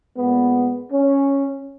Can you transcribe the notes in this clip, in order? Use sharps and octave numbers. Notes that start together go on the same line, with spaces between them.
A#2 G#3 B3
C#4